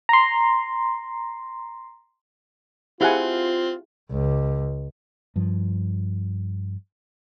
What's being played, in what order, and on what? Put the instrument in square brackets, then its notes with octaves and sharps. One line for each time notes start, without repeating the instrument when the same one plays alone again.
[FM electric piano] A#5 C6
[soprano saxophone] C4 [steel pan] E4 F#5 G#5 [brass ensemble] F4 [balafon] G4 G#4
[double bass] C#2
[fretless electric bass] G2 F3